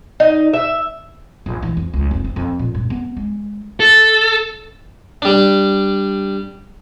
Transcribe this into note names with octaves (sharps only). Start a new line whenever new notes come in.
D#4
E5
A#1
E3
F2
C#2
F1
C4
F2
A#2
G2
B3
G#3
A4
G3 D4